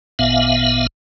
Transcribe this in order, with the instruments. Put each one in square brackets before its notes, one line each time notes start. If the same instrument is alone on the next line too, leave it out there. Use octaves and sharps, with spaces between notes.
[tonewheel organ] G#1 A#2 B3 E5 F5